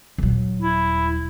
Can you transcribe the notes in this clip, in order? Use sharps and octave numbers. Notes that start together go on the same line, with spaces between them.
D#1 F#3
E4